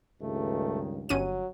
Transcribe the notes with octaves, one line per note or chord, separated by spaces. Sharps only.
C#2 G2 D#3 A3
G1 F#3 C#4 D#7